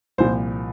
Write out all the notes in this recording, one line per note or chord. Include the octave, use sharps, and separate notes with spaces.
C2 A#2 F3 C5